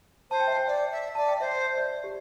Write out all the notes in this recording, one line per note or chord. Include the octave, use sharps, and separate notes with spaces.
C5 A5
G5
E5
G5
D5 G5
E5
D5 A5
G5
C5 E5
D5
G4